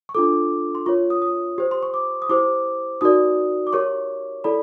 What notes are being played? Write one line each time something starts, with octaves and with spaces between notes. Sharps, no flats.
C#6
D4 F4 A4 D6
C6
F4 A#4 C#5 C#6
D#6
D#6
G4 C5
C6
C#6
D6
D#6
E4 G4 C5 D6
D#4 F#4 A#4 D5 D#6
D6
G4 A#4 C#5 C#6
E4 A4 D5 B5